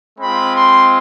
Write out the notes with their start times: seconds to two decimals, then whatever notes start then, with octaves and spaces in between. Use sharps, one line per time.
0.19 G#3 C4 F4 B5
0.55 C6